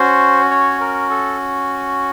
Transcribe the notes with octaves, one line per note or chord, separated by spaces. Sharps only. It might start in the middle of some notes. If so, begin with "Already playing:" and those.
Already playing: C#4 F#4 C5
C#5
A#4
A4